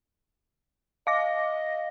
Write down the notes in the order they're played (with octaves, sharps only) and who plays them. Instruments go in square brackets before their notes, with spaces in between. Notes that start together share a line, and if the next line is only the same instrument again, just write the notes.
[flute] D#5 [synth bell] F5 D6 A#6